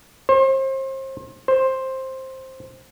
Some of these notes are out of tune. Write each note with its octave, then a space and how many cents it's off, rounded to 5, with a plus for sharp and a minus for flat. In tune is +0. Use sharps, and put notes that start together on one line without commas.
C5 +35
C5 +10